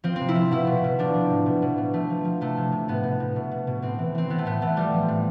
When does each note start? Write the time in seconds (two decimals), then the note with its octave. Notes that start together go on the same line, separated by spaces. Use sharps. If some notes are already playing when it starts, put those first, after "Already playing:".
0.04 F3 C4
0.16 C3 C4
0.29 E4
0.35 F3
0.51 B2 E4
0.67 B2
0.84 B2
0.99 F3 D4
1.15 F3
1.30 A2
1.46 B2
1.62 B2
1.78 B2
1.94 F3 A3
2.10 F3
2.25 F3
2.41 C3 A3
2.57 C3
2.72 C3
2.88 A2 B3
3.04 A2
3.20 A2
3.36 B2
3.52 B2
3.67 B2
3.82 A2 C4
3.99 E3
4.15 E3 C4
4.30 E3 B3
4.38 A3
4.45 A2 B3
4.62 E3 A3
4.77 F3 G3
4.94 F3
5.08 A2